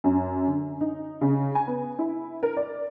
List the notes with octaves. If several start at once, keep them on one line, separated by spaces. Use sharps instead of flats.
F#2
D3
D#4
C#3
G#5
B3
E4
A#4
D5